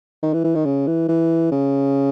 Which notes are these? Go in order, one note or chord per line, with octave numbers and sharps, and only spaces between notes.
D#3
E3
E3
D#3
C#3
E3
E3
C#3